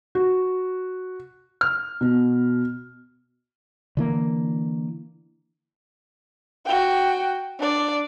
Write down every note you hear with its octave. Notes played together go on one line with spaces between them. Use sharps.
F#4
F6
B2
D3 E3 A#3
F#4 G5
D4 D5